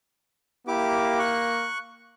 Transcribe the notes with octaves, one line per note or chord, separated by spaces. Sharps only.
A#3 E4 G4 D6
C#6 F#6